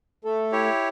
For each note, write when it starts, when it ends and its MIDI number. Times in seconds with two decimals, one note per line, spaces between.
0.25 0.68 57
0.25 0.68 69
0.52 0.89 64
0.52 0.89 67
0.52 0.89 73